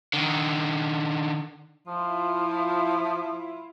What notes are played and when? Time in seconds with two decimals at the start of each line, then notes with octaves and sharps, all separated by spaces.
0.14 D3 D#3
1.87 F3 E4 F4